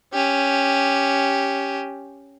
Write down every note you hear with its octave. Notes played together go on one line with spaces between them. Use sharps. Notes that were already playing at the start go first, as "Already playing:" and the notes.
C#4 G4